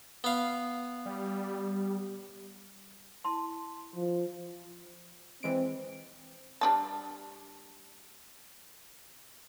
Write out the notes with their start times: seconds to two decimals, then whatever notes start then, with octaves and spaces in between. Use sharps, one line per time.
0.24 B3 F5
1.06 G3
3.25 E4 A5 C6
3.95 F3
5.43 E3 G#3 C4 D7
6.61 G3 D4 A5